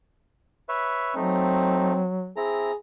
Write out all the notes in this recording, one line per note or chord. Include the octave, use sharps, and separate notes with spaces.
B4 C#5 E5
F#3 A3 C4 D#4
C4 E4 G#4 A#5